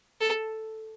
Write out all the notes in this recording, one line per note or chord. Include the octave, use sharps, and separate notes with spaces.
A4